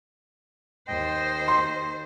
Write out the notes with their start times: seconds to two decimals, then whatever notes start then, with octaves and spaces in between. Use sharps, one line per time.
0.88 D#2 C5 D#5 G5
1.48 C6